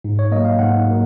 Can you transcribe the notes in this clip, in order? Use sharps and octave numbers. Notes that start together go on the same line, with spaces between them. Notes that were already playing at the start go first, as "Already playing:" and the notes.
G#2
C#5
F#3 A#3 D#5
F5
G#2 F#5
F#3 A#3